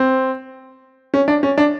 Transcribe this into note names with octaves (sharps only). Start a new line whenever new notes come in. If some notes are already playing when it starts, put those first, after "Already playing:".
Already playing: C4
C#4
D4
C#4
D4